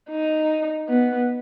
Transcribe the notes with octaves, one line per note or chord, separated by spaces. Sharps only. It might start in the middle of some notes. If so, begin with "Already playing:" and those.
D#4
B3